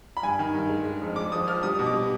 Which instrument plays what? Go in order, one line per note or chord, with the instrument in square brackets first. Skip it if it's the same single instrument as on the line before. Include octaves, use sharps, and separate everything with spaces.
[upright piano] B5
G2 G#5
D#3
G2
G#3
G#3
F2
G#3 D6
F3 D#6
F3 F6
G3 D#6
B2
D6
G3